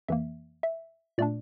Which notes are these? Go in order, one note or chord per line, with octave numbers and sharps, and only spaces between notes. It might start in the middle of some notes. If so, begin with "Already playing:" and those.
F2 E3 A#3 E5
E5
A#2 A3 D4 D5